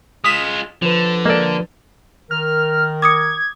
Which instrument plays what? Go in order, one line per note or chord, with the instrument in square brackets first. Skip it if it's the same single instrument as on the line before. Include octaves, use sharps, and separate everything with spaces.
[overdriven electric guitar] G#3 F4 [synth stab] D#6 B6 E7
[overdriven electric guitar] D3 [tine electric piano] F3 B4
[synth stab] G#3 A4 [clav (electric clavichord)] A#3 D5
[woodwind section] D#3 A#4 [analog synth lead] F6
[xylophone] D6 D#6 C#7 [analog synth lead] G#6